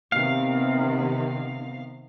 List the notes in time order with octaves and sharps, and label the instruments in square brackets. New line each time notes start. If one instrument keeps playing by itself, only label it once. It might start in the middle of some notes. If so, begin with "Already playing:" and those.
[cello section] C3 D#3 B3 [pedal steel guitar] F5